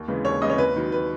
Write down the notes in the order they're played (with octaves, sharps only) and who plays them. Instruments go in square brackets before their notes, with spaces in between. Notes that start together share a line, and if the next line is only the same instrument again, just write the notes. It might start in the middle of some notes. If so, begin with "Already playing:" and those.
Already playing: [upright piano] D#2
C#3 E3 G#3
D#2 C#5
C#3 E3 G#3 D#5
C#5
D#2 B4
D#3 F#3
B4